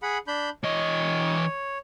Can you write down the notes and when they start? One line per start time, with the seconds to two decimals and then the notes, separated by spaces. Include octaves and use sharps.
0.03 G#4 F#5 B5
0.27 D4 B5 G6
0.63 E3 C#5 D#5